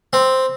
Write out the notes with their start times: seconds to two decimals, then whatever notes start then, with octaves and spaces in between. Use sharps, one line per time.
0.13 C4